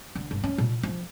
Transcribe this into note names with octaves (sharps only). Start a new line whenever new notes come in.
D3
G1
C#4
A#2
F3